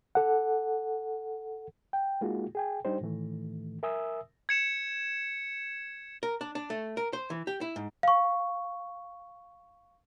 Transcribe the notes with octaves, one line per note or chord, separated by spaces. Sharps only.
A4 F#5
G5
G#3 A#3 D#4 F4 F#4 G#4
G#4 G5 G#5
G3 D4 D#4 G4 C5
A2 D#3 E3 A3
A#4 E5 G#5 D#6 E6
G#6 C#7 E7
A#4
D4
D4
A3
A#4
C5
E3
G4
E4
G#2
F5 C#6